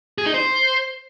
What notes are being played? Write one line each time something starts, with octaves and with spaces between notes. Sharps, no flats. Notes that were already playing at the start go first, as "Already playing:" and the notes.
G#4
D#4
C5